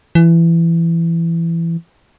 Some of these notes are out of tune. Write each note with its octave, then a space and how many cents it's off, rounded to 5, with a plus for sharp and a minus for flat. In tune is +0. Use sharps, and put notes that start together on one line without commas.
E3 +20